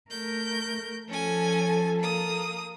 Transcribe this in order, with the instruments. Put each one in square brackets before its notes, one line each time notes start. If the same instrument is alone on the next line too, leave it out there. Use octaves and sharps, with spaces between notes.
[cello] A3 A#4 [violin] G6
[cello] F3 A4 [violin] C#4 G#5
[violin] A#3 D#6